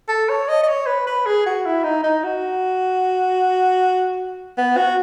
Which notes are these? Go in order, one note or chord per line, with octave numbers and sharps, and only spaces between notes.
A4
C#5
D#5
D#5
C#5
B4
B4
G#4
F#4
E4
D#4
D#4
F#4
B3
F#4